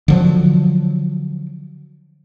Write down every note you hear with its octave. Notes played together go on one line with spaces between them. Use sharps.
D3 F3 F#3